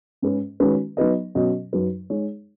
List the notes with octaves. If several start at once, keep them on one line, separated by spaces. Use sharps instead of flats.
G#2 G#3 C#4 B4
D#3 G#3 C#4 F#4 B4
F#3 B3 D#4 B4 D#5
B2 F#3 C#4 F#4 D#5
F#2 F#3 D#4 B4
G#3 D#4 G#4 C#5